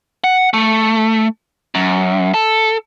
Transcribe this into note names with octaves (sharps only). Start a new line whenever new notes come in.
F#5
A3
F#2
A4